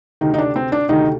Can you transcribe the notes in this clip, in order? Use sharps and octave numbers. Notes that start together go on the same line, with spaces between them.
D2 C3 D#3 D#4
D#4
D4
C4
D4
D2 C3 D#3 D#4